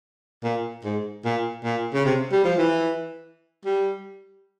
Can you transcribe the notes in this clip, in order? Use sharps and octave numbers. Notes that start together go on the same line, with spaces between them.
A#2
G#2
A#2
A#2
C#3
C3
G3
F3
E3
G3